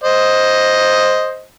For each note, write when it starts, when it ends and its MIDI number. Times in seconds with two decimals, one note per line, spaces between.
0.03 1.43 72
0.03 1.43 75